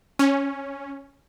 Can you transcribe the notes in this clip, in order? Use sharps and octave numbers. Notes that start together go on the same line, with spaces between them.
C#4